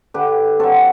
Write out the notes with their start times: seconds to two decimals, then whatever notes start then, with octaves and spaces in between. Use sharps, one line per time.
0.14 D3 G4 B4
0.59 F#3 C4 F#4 A4